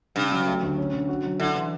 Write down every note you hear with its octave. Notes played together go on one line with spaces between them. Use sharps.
G2 C#3
F#3
A3
D2
C#4
D3
F#4
F#3
D3 E4
E3